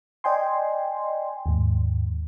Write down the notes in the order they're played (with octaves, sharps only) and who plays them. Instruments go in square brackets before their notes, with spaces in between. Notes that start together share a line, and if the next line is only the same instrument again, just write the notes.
[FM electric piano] D5 D#5 G5 G#5 C6
D#2 G#2